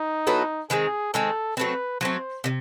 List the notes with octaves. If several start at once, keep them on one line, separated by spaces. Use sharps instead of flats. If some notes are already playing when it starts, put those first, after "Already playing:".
Already playing: D#4
F#3 B3 E4 A4
D#3 G#3 C4 G#4
D#3 G#3 C4 A4
F#3 A3 C4 B4
F#3 A3 C4 C5
C3 D#3